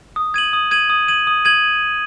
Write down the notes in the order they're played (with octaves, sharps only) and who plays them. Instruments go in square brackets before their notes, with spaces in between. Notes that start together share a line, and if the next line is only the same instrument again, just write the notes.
[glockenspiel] D#6
G#6 D#7 F#7
D#6
G#6 D#7 F#7
D#6
G#6 D#7 F#7
D#6
G#6 D#7 F#7